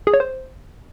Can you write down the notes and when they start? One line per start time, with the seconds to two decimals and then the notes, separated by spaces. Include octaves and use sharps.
0.07 G#4
0.14 C#5
0.20 C5